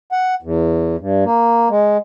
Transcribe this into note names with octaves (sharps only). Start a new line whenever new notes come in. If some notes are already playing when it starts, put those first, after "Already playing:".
F#5
E2
G2
A#3
G#3